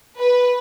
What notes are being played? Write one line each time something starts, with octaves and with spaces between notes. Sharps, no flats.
B4